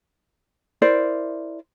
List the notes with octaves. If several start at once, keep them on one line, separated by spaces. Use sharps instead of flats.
E4 A#4 C5 D5